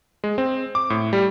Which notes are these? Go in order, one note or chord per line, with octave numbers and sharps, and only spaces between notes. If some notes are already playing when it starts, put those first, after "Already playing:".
G#3
C4
D6
A2
G3